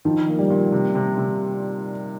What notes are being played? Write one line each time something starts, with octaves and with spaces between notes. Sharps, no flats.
D#3 F3
A#3
G3
A#2
C3
C3
C3